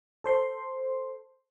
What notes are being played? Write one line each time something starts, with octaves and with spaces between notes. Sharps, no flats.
A4 C5 C6